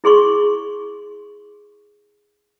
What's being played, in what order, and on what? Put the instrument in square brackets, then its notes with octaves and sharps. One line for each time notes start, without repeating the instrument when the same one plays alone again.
[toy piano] E4 G#4 C6 C#6